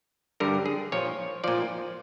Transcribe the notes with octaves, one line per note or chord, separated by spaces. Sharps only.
G2 D3 G3 A#4
G#4
A#2 F3 C#5
A#2 F3 D5